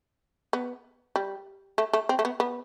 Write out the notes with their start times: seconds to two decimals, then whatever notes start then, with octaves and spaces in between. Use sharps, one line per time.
0.53 B3
1.16 G3
1.78 A3
1.93 A3
2.09 C4
2.19 A3
2.25 B3
2.40 B3